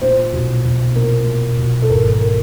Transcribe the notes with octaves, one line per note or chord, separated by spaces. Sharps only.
A#2 C5
B1
B1
A#2 A#4
A#2
B1
A4
G#1 A#4
A#4